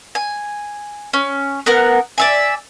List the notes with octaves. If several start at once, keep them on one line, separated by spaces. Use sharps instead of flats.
G#5
C#4
B3 A#4 F#5
D5 E5 G#5